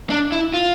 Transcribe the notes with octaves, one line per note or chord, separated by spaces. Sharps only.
D4
E4
F4